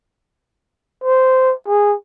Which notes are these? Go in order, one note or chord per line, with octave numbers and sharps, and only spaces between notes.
C5
G#4